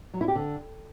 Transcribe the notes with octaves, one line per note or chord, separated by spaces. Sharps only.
F#3
E4
G4
D3